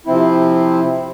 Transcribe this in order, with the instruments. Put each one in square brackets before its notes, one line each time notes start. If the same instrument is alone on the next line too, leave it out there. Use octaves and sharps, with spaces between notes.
[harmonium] C3 F3 C4 E4